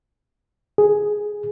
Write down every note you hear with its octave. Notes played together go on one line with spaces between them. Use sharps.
G#4